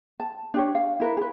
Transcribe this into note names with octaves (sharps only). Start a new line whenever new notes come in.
A5
D4 G4 C#5
F5
E4 A#4 B4
G#4 B4